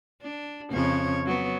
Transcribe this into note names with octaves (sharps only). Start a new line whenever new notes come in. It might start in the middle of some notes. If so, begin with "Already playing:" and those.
D4
F2 C#3 C#5
F#3 B3